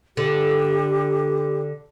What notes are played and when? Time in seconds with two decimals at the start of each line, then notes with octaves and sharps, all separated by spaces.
0.17 D3 G4